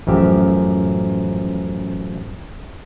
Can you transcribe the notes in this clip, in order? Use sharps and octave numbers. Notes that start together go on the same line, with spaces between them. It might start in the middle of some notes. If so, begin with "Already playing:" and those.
A1 F#2 F3 G4 E5